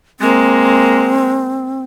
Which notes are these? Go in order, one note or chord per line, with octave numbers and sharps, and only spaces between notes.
G#3 A#3 C4